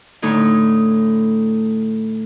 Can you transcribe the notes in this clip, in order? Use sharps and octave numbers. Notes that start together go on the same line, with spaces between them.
A2 D3 A3 D#4 E4